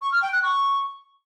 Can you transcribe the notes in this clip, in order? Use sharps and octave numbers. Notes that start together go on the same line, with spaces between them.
C#6
F6
G5
F#6
C#6